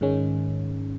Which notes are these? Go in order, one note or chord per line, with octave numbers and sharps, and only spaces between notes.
G#2 D#3 G#3 C#4